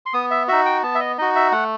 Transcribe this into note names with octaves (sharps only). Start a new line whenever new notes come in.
C6
B3 D#6
E5
D#4 F#4 E5
G5
B3 A5
E5
D#5
D#4 F#4 D#5
E5
A3 F#5